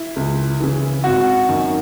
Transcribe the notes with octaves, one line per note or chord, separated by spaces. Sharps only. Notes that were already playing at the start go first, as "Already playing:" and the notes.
Already playing: E4
C#2
C#3 E3
G#1 F#4
F#2 D#3